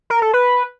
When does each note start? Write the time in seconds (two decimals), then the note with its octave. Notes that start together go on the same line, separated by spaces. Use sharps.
0.10 A#4
0.22 A4
0.33 B4